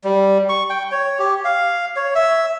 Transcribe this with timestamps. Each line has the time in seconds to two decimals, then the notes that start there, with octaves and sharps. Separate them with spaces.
0.04 G3
0.49 C#6
0.70 G5
0.92 C#5
1.19 G4
1.45 F5
1.96 C#5
2.15 E5